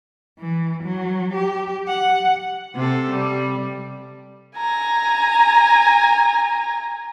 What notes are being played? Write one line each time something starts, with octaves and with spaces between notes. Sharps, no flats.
E3
F#3
G4
F#5
C3 C4 A4
G3
G#5 A#5